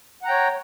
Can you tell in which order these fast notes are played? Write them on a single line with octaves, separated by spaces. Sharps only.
F#5 A#5 G5 C#5